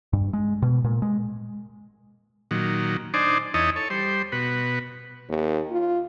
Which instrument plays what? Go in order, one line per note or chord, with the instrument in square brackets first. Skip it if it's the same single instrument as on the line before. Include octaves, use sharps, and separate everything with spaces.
[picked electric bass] G2
G#3
B2
A#2
G#3
[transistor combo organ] A#2 D#3 F#3
D4 D#4 C5 D5 G#5
E2 D#4 E4 C#5 D#5 A5
A4 C#5
G3 C5
B2 F#4 B4
[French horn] D#2
F4